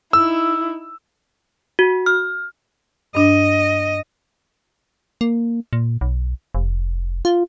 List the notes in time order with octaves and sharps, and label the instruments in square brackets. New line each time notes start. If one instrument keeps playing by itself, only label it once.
[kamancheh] D#4 E4 [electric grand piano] E6
[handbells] F#4
F6
[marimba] G2 D4 [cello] D#5
[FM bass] A#3
A#2
B1
F1
F4